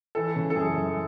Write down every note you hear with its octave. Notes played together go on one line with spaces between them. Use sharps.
E3 A4
C#3
A4
F#2 G#4
F#2